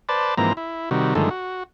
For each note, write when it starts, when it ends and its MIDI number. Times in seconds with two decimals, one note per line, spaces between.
0.09 0.35 71
0.09 0.35 72
0.09 0.35 74
0.09 0.35 81
0.38 0.53 44
0.38 0.53 52
0.38 0.53 53
0.38 0.53 58
0.38 0.53 60
0.38 0.53 82
0.57 0.90 64
0.91 1.14 48
0.91 1.14 51
0.91 1.14 55
0.91 1.14 66
1.15 1.29 43
1.15 1.29 50
1.15 1.29 51
1.15 1.29 53
1.15 1.29 56
1.15 1.29 57
1.30 1.63 66